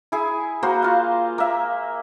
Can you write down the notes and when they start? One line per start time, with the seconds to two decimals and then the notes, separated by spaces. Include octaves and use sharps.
0.12 E4 G#4
0.63 A#3 F#4 C5
0.82 F4 F5
1.38 A#3 E5